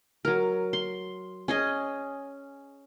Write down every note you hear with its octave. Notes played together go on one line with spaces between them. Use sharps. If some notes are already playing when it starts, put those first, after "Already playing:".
F#3 A#4
C6
C#4 G#4 D#5